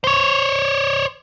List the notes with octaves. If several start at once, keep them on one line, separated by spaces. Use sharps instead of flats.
C5 C#5